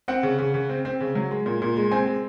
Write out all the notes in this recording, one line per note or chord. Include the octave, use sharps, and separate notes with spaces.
C4 F#5
C#3
C#3
C#3
C4
C4
C#3
F#3
G#3
A#2
A#2
G#3
C4 G#5
G#3